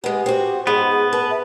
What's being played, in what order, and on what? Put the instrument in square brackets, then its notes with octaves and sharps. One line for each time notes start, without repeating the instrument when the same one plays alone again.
[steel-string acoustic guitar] G#3 B3 [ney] G4
[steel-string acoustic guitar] C4 F#4
[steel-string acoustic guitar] G#2 [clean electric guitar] B3 [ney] G#4
[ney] G#4
[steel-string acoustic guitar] B4 [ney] A5
[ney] E5